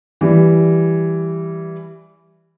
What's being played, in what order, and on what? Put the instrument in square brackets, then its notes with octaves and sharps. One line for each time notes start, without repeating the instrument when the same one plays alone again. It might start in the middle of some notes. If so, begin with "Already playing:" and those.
[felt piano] E3 G3